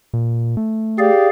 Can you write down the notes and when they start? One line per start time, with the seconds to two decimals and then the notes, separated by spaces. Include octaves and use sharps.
0.14 A#2
0.57 A3
0.98 G4 G#4 D5 F5